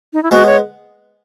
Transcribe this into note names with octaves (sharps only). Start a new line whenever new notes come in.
D#4
E4
G#3 B3 F#4
C#5